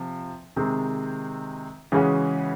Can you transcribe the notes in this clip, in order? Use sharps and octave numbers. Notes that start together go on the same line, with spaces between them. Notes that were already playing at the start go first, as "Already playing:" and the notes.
Already playing: C3 F3
C3 D#3 G#3 C4
C#3 E3 G#3 C#4 F#4